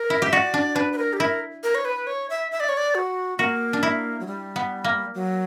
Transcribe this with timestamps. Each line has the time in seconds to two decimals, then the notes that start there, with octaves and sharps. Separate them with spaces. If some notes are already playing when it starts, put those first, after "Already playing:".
Already playing: A#4
0.10 E4
0.22 G4 E5
0.33 F#4 D5
0.54 D4
0.75 D4 B4
0.93 B4
0.98 A#4
1.13 G4
1.20 E4 A#4
1.64 A#4
1.75 C#5
1.85 B4
2.07 C#5
2.30 E5
2.51 E5
2.60 D5
2.69 C#5
2.77 D5
2.95 F#4
3.38 A#3 F#4
3.73 D4
3.83 E4
4.20 F#3
4.27 G3
4.56 B3
4.84 A#3
5.15 F#3